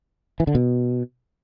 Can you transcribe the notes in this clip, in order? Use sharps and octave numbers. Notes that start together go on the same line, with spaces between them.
E3
D3
B2